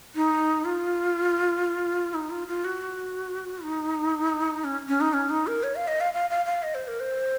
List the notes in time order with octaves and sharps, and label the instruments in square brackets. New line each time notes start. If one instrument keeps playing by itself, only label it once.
[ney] D#4
F4
D#4
F4
F4
F#4
D#4
C#4
C#4
D#4
C#4
D#4
A#4
C#5
F5
D#5
F5
F5
F5
F5
D#5
C5
A#4
C5